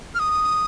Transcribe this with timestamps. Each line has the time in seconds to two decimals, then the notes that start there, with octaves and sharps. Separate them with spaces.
0.15 F6
0.19 D#6